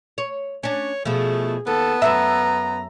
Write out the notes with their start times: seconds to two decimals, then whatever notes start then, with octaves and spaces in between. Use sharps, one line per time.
0.18 C#5
0.63 C#4 D4 C#5
1.05 B2 F3 A3 G#4
1.67 D#2 B3 A4
2.02 F#2 B4 E5 A#5